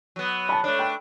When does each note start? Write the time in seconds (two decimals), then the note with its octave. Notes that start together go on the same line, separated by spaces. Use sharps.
0.16 F#3 B3
0.49 A5 B5
0.64 A3 D4 C#5
0.79 G5 B5